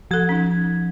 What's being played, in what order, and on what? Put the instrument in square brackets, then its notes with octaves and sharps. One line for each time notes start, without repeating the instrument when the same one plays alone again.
[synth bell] F3 G#6 [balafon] A4 F#5
[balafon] C#4 D#4